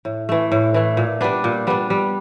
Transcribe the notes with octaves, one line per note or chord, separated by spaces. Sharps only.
A2
E3 A3
A2
E3 A3
A#2
G3 B3 D4
A#2
G3 B3 D4
G3